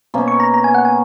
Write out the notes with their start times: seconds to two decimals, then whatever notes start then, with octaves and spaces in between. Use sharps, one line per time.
0.14 B2 A#3 C#4
0.28 C#6
0.40 A#5
0.54 A#5
0.64 G#5
0.74 F#5
0.85 G#5